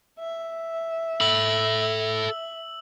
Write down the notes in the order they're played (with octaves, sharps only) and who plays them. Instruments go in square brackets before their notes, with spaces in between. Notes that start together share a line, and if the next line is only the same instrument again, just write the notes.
[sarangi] E5
[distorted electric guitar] A4 B5 [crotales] E6 F#7